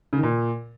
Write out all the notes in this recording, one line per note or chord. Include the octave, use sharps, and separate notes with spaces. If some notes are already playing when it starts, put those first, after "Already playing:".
C#3
D#3
A#2